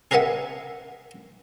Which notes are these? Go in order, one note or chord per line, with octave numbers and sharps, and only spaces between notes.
G#4 A#4 B4 E5 F#5 G#5